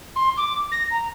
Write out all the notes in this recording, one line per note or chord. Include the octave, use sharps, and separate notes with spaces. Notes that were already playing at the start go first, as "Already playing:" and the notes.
C6
D6
A#6
A#5